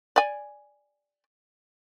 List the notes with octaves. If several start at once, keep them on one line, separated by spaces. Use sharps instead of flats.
D5 G#5